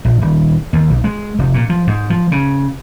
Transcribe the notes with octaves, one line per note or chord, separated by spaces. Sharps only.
A#1
D#1
D#2
B1
G#3
F1
A#2
F3
G#2
F3
C#3